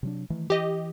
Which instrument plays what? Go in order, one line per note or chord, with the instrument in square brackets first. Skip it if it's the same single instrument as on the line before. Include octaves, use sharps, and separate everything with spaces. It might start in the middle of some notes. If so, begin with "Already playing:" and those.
[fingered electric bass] C3 F#3 D4
D#3 E3 A3
[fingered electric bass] E3 [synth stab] G4 D#5